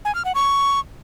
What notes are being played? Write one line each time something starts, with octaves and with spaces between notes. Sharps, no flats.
G#5
F6
F#5
C#6